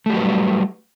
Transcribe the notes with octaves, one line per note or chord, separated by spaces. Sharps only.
F#3 G3 A3 G4 B4